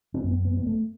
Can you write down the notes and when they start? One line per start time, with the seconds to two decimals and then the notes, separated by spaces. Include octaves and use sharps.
0.14 C4
0.24 F#2 B3
0.45 B3
0.57 B3
0.67 A3